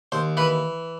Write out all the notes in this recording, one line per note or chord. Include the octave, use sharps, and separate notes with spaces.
D#2 C5
E3 B4